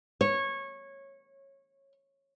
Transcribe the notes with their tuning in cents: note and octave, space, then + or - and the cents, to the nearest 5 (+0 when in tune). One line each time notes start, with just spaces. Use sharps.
C#5 -20